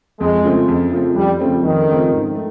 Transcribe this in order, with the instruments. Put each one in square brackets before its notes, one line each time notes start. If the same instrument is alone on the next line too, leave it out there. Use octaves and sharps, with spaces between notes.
[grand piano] F2 [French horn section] G#3
[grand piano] C#3 F3 A3 C4
F2
C#3 F3 A3 C4
[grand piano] F2 [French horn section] G3
[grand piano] C#3 F3 A3 C4
[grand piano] F2 [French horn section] D#3
[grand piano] C#3 F3 A3 C4
G#2
A3